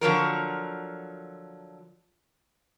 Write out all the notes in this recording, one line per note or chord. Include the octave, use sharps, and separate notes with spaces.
D3 F3 F#3 A#4